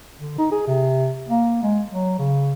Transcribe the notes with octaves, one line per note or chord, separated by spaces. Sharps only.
D3
D#4
G#4
C3
A#3
G#3
F#3
C#3